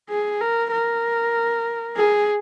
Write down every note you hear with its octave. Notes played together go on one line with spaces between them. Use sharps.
G#4
A#4
A#4
G#4